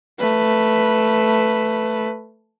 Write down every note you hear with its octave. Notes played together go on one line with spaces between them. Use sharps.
A3 B4